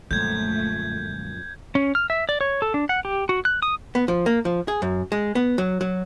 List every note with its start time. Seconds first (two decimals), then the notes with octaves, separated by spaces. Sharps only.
0.11 F#2 A#2 D3 F3 G#3 A3 G6 G#6
1.75 C#4
1.95 F6
2.10 E5
2.29 D5
2.41 C#5
2.62 A4
2.74 D4
2.89 F#5
3.05 G4
3.29 F#4
3.45 F#6
3.62 D#6
3.95 B3
4.08 F3
4.26 A#3
4.45 F3
4.68 G#4
4.82 F#2
5.12 G#3
5.35 B3
5.58 F#3
5.81 F#3